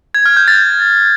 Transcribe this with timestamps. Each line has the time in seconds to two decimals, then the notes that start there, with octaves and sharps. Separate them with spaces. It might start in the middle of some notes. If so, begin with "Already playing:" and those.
0.15 G#6
0.26 F6
0.37 G6
0.48 A6